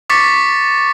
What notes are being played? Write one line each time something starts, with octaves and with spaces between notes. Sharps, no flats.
C#6 D6 A6 B6 C#7